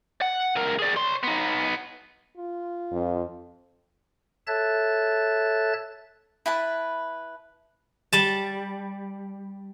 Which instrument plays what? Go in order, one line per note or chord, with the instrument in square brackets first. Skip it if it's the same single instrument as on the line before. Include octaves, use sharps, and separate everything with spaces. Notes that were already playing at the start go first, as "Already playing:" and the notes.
[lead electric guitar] F#5
C#2 A#4
G#4 D5
C#5 C6
B3 D#4
[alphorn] F4
[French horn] F2
[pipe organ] A4 C#5 E5 A5 F#6 A6
[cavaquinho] E4 B4 A5
[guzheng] G3 A5